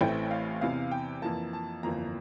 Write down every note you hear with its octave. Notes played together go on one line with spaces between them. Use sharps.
A1 A2 E3 A3 C4 G5
F5
E2 C3 E3 F5
G5
F2 E3 A#3 A5
A5
G1 F2 E3 A#3 A#5